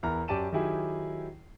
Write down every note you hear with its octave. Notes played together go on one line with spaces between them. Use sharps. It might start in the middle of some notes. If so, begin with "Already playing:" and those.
E2 E4 A#4 A#5 F6
F#2 G4 D5 A5 D#7 E7
D#3 F#3 D#4 E4 G4 G#4